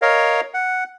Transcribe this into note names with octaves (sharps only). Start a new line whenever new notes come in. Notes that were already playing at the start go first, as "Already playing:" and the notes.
A#4 C#5 D#5 F5
F#5